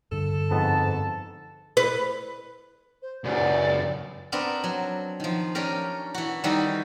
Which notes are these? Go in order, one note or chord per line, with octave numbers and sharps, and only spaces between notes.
G2 D3 A4
F2 G#2 B3 A5
B4
C5
C#2 F#2 D5
B3 C4 D4 A#4 B4
F#3
D#3 F3
C#4 D4 G4 A#4
E3 F#4
D#3 E3 G3 D#4 F#4 A4